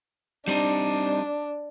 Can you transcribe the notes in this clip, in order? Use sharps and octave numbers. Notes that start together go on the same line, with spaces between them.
G3 C4 D4 D#4